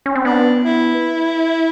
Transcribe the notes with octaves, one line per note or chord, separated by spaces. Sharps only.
C#4
C4
B3 D4
E4